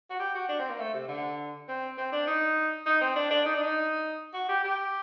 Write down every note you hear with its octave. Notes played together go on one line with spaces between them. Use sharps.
F#4
G4
F#4
D4
C4
A#3
A3
C3
D3
C4
C4
D4
D#4
D#4
C4
D4
D4
D#4
D4
D#4
F#4
G4
G4